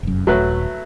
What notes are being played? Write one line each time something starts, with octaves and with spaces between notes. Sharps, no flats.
F1 F#2
D#1 F#3 A3 B4